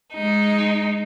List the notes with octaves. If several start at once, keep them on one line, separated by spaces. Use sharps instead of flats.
G#3 D#4